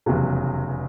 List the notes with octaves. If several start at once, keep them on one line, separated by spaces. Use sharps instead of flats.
F1 E2 C#3 F#3